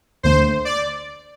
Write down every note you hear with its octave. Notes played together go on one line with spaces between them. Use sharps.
D2 D3 A3 C5
D5